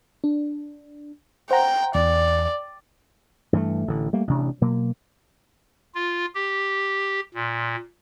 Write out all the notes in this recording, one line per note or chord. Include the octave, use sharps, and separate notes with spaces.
D4
C5 F#5 G5 A#5
E2 D5
G2 E3 G#3 A3
A1 D3
G3 A3 A#3
A1 C3 D4
B2 F#3 A#3
F4
G4
A#2